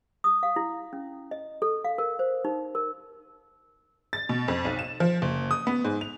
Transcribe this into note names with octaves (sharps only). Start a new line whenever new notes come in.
D#6
F5
E4
C#4
D#5
A4
F5
A#4
C5
D#4
A#4
A6
B2
F2
B1
E7
F3
F#1
D#6
B3
G#2
F7